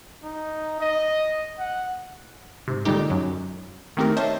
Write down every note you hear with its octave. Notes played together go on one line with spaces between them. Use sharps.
D#4
D#5
F#5
G#2 C3
A#2 D3 G3 G#3 D#4 G4
F#2 F#3
D#3 A3 C4 D#4 G4 A#4
C5 C#5 D#5 E5 A5